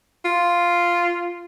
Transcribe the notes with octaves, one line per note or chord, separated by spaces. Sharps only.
F4